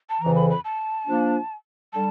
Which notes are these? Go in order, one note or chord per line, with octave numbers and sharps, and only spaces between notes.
A5
F2 C#3 E3 A#5
B5
B5
A5
F3 A#3 D4
D3 G3 A5